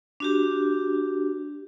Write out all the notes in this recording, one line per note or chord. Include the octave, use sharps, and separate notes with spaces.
D4 F#4 G4